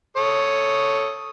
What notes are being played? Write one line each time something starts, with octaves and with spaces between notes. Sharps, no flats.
A4 C#5 D#6